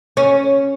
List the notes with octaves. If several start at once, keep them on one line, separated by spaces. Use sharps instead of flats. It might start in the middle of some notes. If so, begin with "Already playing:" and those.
C#4